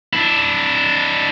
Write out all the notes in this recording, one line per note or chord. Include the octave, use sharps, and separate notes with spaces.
D4 E4